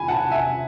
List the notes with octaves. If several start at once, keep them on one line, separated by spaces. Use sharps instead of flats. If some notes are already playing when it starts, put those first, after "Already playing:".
Already playing: G#5 B5
F#5 A5
E5 G#5